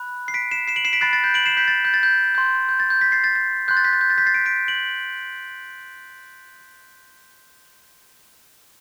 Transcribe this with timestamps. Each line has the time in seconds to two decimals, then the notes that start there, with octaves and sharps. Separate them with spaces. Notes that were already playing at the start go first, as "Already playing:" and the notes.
Already playing: B5 F#6
0.28 C7
0.34 B6 D7
0.51 C7 E7
0.68 C7 E7
0.76 D7 F#7
0.85 C7 E7
0.93 B6 D7
1.01 B5 F#6 A6 C7
1.13 A6
1.24 G6
1.34 D7 F#7
1.46 C7 E7
1.57 G6 B6
1.68 A6
1.85 G6
1.94 A6
2.03 G6
2.35 C6 G6
2.69 G6
2.80 A6
2.90 G6
3.01 G6 B6
3.12 A6 C7
3.24 A6
3.35 A6
3.68 C6 F#6 G6
3.77 A6
3.84 G6 B6
3.93 A6
4.01 G6
4.10 A6
4.18 G6 B6
4.26 A6 C7
4.34 B6 D7
4.45 B6 D7
4.68 D7 F#7